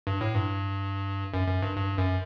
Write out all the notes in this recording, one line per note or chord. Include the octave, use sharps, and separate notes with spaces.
G2
A2
G2
F#2
F#2
G2
G2
F#2